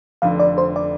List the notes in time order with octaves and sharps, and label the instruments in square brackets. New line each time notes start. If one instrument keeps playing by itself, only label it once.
[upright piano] F1 F2 D3 [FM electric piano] F5
[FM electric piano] D5
C5
D5